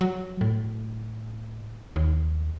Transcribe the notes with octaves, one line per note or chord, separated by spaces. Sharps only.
F#3
A2
D#2